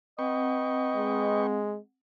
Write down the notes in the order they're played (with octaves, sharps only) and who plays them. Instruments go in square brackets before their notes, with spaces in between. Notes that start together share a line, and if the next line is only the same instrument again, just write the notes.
[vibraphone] C4 F#5 [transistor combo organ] B4 G5 C#6 [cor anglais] D#5
[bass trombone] G#3